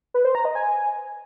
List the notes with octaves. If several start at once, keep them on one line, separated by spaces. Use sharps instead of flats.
B4
C5
A#5
D#5
G#5